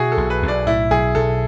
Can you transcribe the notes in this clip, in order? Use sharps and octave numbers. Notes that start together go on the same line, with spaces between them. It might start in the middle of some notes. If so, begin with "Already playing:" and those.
Already playing: B2 E4 F#4 G#4
A4
B1
B4
B1
D5
A2 E4
B1 G#4
B1 A4